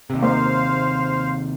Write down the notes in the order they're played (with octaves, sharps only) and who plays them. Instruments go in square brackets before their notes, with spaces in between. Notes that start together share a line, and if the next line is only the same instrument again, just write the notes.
[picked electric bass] D#2 C3
[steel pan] A#3 [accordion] C5 F5